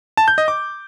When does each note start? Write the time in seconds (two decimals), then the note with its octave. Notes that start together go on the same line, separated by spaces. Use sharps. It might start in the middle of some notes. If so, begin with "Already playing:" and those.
0.17 A5
0.28 G6
0.38 D#5
0.48 D6